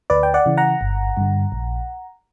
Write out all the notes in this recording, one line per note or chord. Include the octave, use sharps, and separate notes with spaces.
D2 B4 D5
G5
D5 F#5
C#3 E3
F#5 A#5
G1
G2 D3
A#1